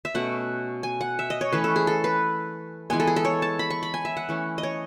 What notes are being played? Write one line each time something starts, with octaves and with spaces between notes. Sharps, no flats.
E5
B2 A3 C#4 F#5
G#5
F#5
E5
D#5
C#5
E3 A3 C#4 B4
A4
G#4
A4
B4
E3 G#3 B3 G#5
A4
G#4
A4
C#5
A5
B5
C#6
B5
G#5
E5
F#5
E3 A3 C#4
D#5
C#5